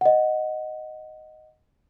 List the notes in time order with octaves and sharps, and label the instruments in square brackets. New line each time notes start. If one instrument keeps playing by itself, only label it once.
[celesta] D#5 F#5